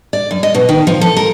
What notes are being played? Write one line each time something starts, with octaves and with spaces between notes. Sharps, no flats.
D5
F#2
D#5
B2
D#3
F3
A4
A#4